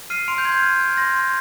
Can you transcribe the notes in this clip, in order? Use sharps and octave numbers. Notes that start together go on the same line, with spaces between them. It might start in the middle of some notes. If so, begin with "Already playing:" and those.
F6 C7 D#7
C6 D7 F7
G6
C6 G#6
F6 G#6
F6 G#6
C6 G6 A#6
C6